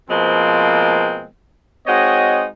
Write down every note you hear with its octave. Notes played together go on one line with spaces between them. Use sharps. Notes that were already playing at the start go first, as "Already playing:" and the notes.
B2 F3 G#3 A#3 C4
G#3 C4 D#4 F#4 C#5 D#5